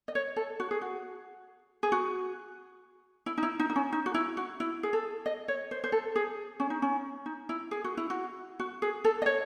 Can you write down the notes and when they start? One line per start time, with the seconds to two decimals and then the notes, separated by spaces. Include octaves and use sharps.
0.08 D#5
0.15 C#5
0.36 A4
0.60 F#4
0.71 G#4
0.81 F#4
1.83 G#4
1.92 F#4
3.26 E4
3.38 D#4
3.43 E4
3.59 D#4
3.70 D#4
3.76 C#4
3.92 D#4
4.06 F#4
4.14 E4
4.37 F#4
4.60 E4
4.83 G#4
4.93 A4
5.26 D#5
5.48 C#5
5.71 C5
5.84 C5
5.92 A4
6.16 G#4
6.60 C#4
6.70 D#4
6.82 C#4
7.26 D#4
7.49 E4
7.71 G#4
7.84 F#4
7.97 E4
8.10 F#4
8.60 F#4
8.82 G#4
9.04 A4
9.22 D#5
9.26 C#5